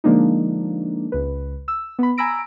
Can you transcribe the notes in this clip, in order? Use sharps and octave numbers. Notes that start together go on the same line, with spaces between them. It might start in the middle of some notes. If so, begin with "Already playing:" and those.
D3 F3 G#3 A#3 D4 D#4
C#2 B4
E6
B3 B5
G#5 A#5 B5 E6 A#6 D7